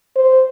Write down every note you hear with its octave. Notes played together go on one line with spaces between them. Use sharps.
C5